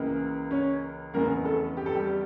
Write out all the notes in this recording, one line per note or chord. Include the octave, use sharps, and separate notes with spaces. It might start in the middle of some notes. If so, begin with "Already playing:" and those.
Already playing: C#2 C#3 E3 A#3
C#4 C#5
F1 E2 C#3 A#3 A#4
A3 A4
G4
A4
G3 G4